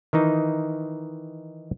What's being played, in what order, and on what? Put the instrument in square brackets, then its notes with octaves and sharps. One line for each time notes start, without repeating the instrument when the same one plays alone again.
[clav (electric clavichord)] D#3 E3 D#4